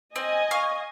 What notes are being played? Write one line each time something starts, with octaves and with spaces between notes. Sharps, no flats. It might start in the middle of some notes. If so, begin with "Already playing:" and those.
C4 D#5 G#5
F5 C#6 F6